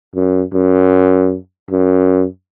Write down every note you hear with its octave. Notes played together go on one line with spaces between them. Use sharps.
F#2
F#2
F#2